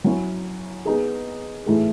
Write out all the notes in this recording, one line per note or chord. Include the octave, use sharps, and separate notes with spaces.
F#3 C#4 E4
B3 D#4 G#4
A2 E3 A3 D#4 G#4